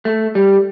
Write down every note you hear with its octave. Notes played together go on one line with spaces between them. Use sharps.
A3
G3